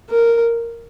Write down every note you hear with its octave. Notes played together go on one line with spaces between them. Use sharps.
A#4